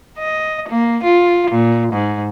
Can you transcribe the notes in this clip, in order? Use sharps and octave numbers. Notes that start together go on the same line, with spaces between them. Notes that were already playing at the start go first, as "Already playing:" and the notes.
D#5
A#3
F4
A#2
G#2